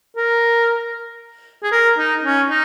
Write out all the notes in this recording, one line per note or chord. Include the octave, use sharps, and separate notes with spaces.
A#4
G#4
A#4
D#4
C#4
D#4